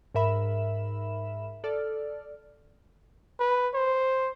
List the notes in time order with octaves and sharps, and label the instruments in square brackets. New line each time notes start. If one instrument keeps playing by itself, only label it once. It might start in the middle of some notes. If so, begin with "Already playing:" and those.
[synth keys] G#2 A#4 E5 B5 E7
A4 D5 F6
[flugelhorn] B4
C5